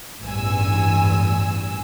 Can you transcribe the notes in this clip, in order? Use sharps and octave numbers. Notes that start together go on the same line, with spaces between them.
A1 E2 G2 G#5 E6